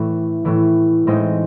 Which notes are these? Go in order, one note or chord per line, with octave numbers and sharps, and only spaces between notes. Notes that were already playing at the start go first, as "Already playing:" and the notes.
Already playing: A2 E3 A3
A2 E3 A3
A2 G#3 C4 D#4